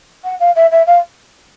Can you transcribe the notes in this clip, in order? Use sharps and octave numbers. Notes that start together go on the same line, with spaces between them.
F#5
F5
E5
E5
F5